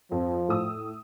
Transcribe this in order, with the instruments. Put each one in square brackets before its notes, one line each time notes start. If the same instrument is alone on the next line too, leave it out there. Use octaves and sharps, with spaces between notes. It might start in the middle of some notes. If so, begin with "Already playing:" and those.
[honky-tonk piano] F2 [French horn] F3
[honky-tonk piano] A2 D#6 E6